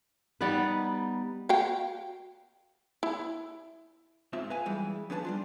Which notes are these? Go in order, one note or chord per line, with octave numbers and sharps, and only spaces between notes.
G3 B3 D#4 B4
F#4 F5 G5
E4
G#2 C4 F4 E5
B4 F5 G#5
F#2 E3 G3 G#3 E4
F3 C#4 D4 B4 G#5 A5
G3 D4 F4